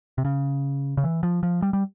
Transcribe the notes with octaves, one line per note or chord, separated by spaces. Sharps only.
C3
C#3
C#3
E3
F3
F3
G3
G3